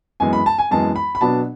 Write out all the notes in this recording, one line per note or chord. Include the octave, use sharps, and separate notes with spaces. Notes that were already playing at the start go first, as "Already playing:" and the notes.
F#2 E3 G#3 B3 G#5
B5
A5
G#5
F#2 E3 G#3 B3 A5
B5
B5
B2 F#3 B3 D4 A5